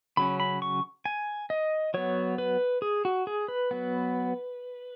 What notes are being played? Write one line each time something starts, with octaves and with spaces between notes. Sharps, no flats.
C#3 F#3 C#4 B5
B5
C#6
G#5
D#5
F#3 B3 C#5
B4
G#4
F#4
G#4
B4
F#3 B3